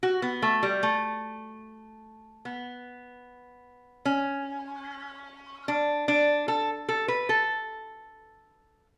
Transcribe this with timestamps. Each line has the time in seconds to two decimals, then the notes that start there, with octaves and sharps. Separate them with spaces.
0.03 F#4
0.22 B3
0.42 A3
0.63 G3
0.83 A3
2.45 B3
4.05 C#4
5.68 D4
6.08 D4
6.48 A4
6.89 A4
7.08 B4
7.29 A4